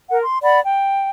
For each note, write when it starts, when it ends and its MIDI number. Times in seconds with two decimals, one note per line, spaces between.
0.09 0.20 70
0.09 0.20 78
0.23 0.38 84
0.42 0.59 74
0.42 0.59 78
0.42 0.59 83
0.62 1.08 79